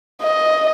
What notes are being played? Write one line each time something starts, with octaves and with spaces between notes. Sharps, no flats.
D#5